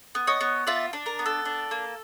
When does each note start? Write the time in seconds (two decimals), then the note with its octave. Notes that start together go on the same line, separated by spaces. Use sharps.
0.15 B3
0.27 C#5 D#5
0.41 B3
0.67 F4 D5 E5
0.93 D4
1.06 A#4
1.19 B3
1.26 A4
1.45 D4
1.71 A#3